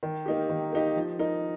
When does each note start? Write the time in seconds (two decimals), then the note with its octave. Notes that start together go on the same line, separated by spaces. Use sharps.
0.03 D#3
0.26 A#3 D#4 G4
0.49 D#3
0.72 A#3 D#4 G4
0.96 F3
1.19 D#4 A#4